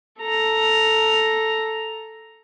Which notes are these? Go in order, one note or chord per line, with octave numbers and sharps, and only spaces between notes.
A4 A#5